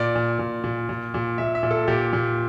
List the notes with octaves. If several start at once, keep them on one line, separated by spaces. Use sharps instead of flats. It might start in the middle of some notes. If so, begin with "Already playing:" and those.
Already playing: A#2 D5
A#2
A#2
A#2
A#2
A#2
A#2 E5
E5
A#2
A4
A#2 G4
A#2